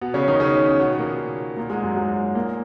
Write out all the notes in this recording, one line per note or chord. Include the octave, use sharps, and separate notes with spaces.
B2 B3
C#3 C#4
D#3 D#4
C#3 C#4
C#4
B2 B3
A#2 A#3
A#2 A#3
G#2 G#3
F#2 F#3
G#2 G#3
A#2 A#3